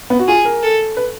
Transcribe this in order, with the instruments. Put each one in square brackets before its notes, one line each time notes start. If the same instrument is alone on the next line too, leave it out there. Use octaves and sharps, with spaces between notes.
[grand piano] B3
F#4
[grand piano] F4 [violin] G#4
[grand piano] A#4
[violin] A4
[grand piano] B4